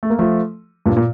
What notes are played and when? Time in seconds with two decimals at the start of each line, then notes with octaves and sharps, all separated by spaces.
0.03 A3
0.10 A#3
0.19 F3 A3
0.86 G2 A#2
0.97 A#2